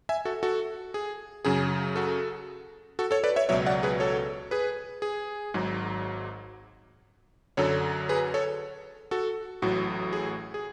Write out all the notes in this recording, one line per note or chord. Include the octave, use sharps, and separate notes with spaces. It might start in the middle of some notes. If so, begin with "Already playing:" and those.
E5 G#5
F#4 A4
F#4 A4
G#4
F#2 C#3 F#3 G#4
F#4 A4
F#4 A4
A4 C#5
B4 D5
C#5 E5
C#2 B2 F#3 C#5 E5
D5 F#5
G#4 B4
A4 C#5
G#4 B4
G#4
G#1 G#2 F#3
F#2 D3 F#3 A4 C#5
G#4 B4
A4 C#5
F#4 A4
A1 A2 F#3 F#4
G#4
G#4